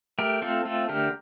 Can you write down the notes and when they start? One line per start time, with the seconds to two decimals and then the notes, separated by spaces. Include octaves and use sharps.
0.19 A3 G4 A#4
0.42 C4 F4 A4
0.65 A3 F4 A4
0.89 D3 G4 A#4